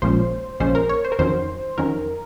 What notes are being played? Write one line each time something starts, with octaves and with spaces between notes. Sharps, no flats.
A#1 A#2 F3 G#3 C#4 C5
A#1 A#2 F3 G#3 C#4 C5
A#4
C#5
C5
A#4
F2 D#3 F#3 C#4 C5
F2 D#3 F#3 C#4 A#4